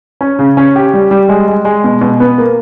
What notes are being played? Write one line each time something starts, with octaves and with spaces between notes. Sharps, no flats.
C#4
C#3
C#4
G4
G3
G3
G#3
G#3
G#3
B2
B2
B3
A#3